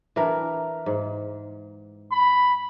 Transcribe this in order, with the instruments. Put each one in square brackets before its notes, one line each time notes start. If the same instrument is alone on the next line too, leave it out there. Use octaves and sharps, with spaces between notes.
[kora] E3 D4 A#4
G#2
[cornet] B5